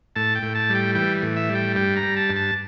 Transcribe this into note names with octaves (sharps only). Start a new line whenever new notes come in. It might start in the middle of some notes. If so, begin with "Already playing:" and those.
A2 A5
G5
A2
A5
G3
G5
E3 G5
A2
E5
G3
G5
G2 G5
A#5
G3
A5
G2
A5